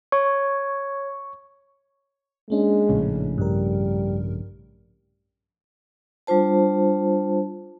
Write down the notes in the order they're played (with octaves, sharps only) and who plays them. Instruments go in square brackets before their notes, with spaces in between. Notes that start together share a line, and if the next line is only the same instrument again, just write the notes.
[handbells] C#5 [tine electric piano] C#6
[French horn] G#3 [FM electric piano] A#3 C#4 D4
[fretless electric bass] A#1 A2 C#3
[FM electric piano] G2 A#4 [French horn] G3
[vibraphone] G3 D4 F4 C5 A5